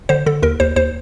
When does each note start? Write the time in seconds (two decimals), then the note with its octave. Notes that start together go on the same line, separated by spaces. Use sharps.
0.09 D3 C5
0.26 D3 A4
0.43 D#2 A#4
0.60 D#2 C5
0.76 D#2 C5